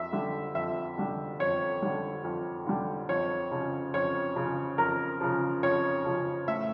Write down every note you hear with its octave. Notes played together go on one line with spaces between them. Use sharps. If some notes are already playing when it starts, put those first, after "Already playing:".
Already playing: F2 E5
D3 G3
F2 E5
D3 G3
F2 C#5
D3 G3
F2
D3 G3
F2 C#5
C#3 F3
F2 C#5
C#3 F3
F2 A#4
C#3 F3
F2 C#5
C#3 F3
A2 E5